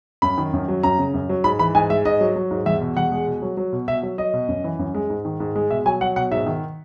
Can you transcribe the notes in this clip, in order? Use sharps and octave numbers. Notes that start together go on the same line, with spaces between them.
F#2 B5
D#3
F#2
F#3
F#2 A#5
C#3
F#2
F#3
G#2 B5
E3 B5
G#2 G#5
G#3 E5
G#2 D#5
F#3
F#3
G#2
E2 E5
B2
E2 F#5
G#3
B2
F#3
F#3
B2
B2 E5
F#3
F#3 D#5
B2
F#2
E3
F#2
G#3
G#2
D#3
G#2
G#3
B2 E5
F#3 G#5
F#3 F#5
B2 F#5
G#2 E5
D#3